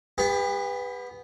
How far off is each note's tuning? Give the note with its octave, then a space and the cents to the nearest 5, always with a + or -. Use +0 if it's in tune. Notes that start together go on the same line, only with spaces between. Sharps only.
B3 +0 G4 +45